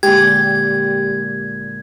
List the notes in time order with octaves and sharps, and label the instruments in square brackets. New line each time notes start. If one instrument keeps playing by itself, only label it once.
[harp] A#2 D3 G#3 [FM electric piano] G4 [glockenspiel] G#6